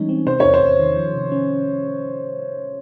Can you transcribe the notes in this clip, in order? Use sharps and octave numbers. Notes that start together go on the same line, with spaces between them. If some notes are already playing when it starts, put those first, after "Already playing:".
Already playing: E3 G3 G#3 C#4 D#4
C4
C3 C5
E2 C#5
C5
E2
D#3
F3
C3
C#4